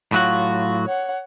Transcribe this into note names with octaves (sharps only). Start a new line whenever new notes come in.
A2 F#3 F4 F#4
C#5 F#5